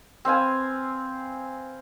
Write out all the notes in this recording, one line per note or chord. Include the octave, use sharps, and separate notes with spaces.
C4 B4 F5 G#5